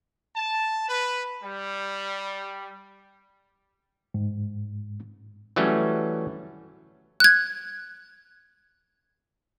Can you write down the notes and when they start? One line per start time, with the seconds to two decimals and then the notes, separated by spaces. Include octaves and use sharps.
0.36 A5
0.89 B4
1.43 G3
4.14 G#2
5.56 E3 F#3 G3 A3 C#4
7.20 F#6 G#6